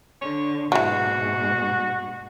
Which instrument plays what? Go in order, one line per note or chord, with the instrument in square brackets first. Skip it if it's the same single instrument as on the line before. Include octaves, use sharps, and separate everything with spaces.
[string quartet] D3 [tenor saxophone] C#5
[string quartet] G#2 B2 [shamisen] E3 F#3 [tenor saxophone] F#4